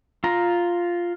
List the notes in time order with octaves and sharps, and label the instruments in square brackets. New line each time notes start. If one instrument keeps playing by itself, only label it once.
[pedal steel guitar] F4 A#5